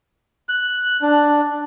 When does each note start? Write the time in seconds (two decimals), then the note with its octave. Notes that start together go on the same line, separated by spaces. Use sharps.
0.49 F#6
1.02 D4